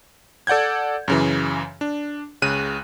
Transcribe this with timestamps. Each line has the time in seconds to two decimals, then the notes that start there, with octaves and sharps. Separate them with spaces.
0.47 A4 D5 F#5 G6 G#6
1.08 F#2 C#3 E3
1.81 D4
2.42 C#2 C#3 F#6 D#7